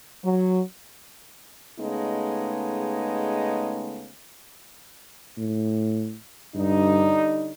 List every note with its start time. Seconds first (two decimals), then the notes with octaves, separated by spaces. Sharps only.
0.24 F#3
1.79 C#3 G#3 A3 B3 D#4
5.38 A2
6.55 G2 D3 G3 D#4